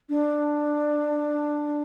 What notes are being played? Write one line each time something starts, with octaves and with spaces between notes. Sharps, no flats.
D4